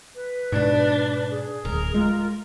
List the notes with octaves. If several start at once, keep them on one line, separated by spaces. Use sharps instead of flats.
B4
G#2 B2 D4
G#4
D1 A#4
G#3 F4